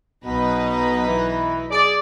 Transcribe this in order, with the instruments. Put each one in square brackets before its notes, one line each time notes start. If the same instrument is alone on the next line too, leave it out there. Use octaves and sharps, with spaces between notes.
[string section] B1 D#4 B4 [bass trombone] B2
[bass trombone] E3
[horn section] G#4 D5